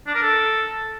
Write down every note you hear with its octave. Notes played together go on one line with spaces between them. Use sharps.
D4
A#4
A4